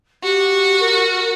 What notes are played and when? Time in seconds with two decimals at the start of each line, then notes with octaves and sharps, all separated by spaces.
0.24 F#4 G4
0.80 A#4